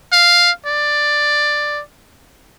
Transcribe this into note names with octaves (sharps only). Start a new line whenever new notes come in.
F5
D5